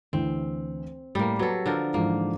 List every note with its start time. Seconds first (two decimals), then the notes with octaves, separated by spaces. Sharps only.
0.13 D2 E3 C4
1.15 A2 G3 A#3
1.39 F#3 G4 A4 B4
1.66 D3 F3 A#4
1.94 G#2 E3 F3 A#3